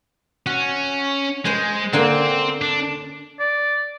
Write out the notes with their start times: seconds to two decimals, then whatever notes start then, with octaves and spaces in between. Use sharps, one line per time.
0.46 C#4 F#4
1.45 G#3 C5 G#5
1.93 D3 A#3 C4 G#5
2.61 D4
3.40 D5